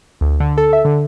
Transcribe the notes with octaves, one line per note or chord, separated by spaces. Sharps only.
D2
D3
A4
E5
D3